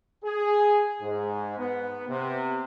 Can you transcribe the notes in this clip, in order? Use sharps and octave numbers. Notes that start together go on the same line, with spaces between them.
G#4
G#2
B3
C3